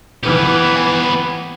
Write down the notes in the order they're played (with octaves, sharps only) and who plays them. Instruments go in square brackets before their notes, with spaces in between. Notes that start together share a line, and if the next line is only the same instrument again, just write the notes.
[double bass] E3 [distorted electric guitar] B3 G4